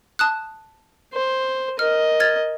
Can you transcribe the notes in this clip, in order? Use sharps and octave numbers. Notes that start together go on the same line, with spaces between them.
A5 D#6 F#6
C5
A#4 D#5 F6
F6 G#6 A6